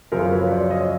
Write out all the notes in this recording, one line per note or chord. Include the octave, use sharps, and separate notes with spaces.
F#2 C#3 F3 A#4 C5
B4 C#5
C5 D5
C#5 D#5